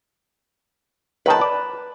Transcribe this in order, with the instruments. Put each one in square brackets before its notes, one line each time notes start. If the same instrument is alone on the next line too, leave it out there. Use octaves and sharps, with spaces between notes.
[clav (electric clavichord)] C#2 D#3 G5 [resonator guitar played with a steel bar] B4 A5
[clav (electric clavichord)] D5